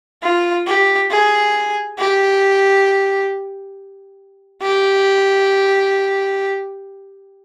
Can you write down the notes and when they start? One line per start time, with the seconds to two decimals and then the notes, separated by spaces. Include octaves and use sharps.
0.23 F4
0.67 G4
1.11 G#4
1.98 G4
4.63 G4